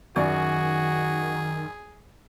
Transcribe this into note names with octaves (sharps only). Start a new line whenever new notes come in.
F#2 D#3 F#4 G#4 D5 C#6